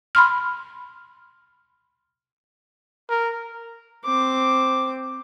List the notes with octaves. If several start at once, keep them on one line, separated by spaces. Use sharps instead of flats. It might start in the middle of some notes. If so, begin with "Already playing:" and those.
B5 C6 F6
A#4
C4 D6